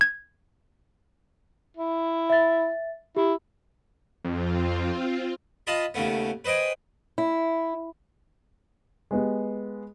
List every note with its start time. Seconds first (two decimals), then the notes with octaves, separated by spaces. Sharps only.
0.01 G#6
1.77 E4
2.30 E5 A6
3.16 E4 G4
4.25 F2 C4 F4
5.67 F4 D#5 A5 B5
5.94 D#2 C#3 A3 B3
6.45 B4 C5 D#5 G5 G#5
7.18 E4
9.11 G#3 B3 G4